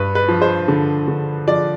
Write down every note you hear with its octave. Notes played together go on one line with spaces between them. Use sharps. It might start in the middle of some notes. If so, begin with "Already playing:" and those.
Already playing: G2 B4
B4
F3
C5
D3
D3
F3 D5